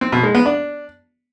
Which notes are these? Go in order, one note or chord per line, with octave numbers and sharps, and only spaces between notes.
C4
B2
G#3
B3
D4